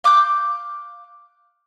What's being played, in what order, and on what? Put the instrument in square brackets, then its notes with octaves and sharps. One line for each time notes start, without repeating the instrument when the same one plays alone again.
[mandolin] F5 D6 F#6 G6